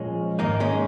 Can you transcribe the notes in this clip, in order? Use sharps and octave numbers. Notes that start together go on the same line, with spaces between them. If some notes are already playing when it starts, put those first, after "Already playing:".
Already playing: A#2 F3 G#3 C#4
G#2 D#3 A#3 D#4
G#3 C#4